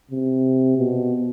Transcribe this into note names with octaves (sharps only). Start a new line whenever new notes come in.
C3
B2